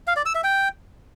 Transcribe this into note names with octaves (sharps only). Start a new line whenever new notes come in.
F5
D5
E6
E5
G5